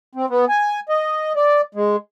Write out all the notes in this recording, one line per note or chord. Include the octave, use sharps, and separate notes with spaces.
C4
B3
G#5
D#5
D5
G#3